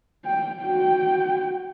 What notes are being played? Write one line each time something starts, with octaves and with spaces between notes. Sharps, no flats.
G5
F#4 G5